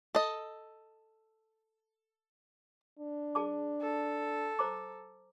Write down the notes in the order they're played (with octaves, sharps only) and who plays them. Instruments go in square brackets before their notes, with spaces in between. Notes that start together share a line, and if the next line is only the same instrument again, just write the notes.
[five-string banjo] A4 D#5
[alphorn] D4
[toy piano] G#4 A5 D6
[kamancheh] A4
[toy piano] C5 A#5 D6